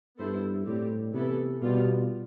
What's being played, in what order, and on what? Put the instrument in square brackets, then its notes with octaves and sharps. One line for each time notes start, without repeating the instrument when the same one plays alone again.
[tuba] G2 [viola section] B3 E4 A4 C5
[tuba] A2 [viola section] G3 C4 G4
[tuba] C3 [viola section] E3 B3 E4 A4
[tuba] B2 [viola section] G3 B3 F4